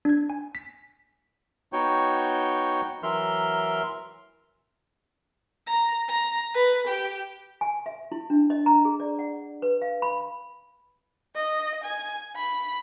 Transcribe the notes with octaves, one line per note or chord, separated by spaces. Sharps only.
D4 G#6
G#5
B6
B3 D#4 F#4 C#5 G5
E3 F#3 A#4 E5 C6 F6
A#5
A#5
B4
G4
G#5
E5
E4
D4
D#5
A#5
G#4
D5
F#5
B4
F5
B5
D#5
G#5
B5